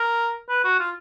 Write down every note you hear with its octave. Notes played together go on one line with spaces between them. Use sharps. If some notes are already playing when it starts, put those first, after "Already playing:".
Already playing: A#4
B4
F#4
F4